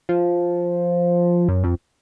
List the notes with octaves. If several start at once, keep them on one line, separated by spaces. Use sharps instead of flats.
F3
F#2
F2